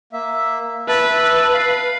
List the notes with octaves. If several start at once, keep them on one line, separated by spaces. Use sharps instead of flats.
A#3 E5
B4 E5 A5
F5